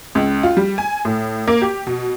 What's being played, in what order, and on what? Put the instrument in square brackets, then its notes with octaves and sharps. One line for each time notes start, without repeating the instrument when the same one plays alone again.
[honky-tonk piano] C#2
F4
G3
G#5
A2
A#3
G4
B2